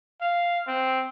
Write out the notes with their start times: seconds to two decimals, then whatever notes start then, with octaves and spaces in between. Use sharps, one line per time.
0.21 F5
0.68 C4